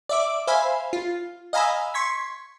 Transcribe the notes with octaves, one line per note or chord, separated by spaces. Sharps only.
D5 E5 D6
C5 E5 F5 G#5 B5
F4
D#5 F5 G#5 A#5 B5 E6
C6 C#6 G#6 B6